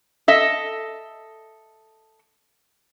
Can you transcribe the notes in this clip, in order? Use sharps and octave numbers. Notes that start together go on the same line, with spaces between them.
A4 D#5 E5